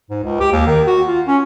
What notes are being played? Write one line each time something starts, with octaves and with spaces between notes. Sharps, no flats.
G#2
C#2
G4
D#2
D#3
F#4
F4
C#4